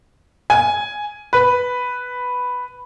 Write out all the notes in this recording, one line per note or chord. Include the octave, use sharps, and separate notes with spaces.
G#5
B4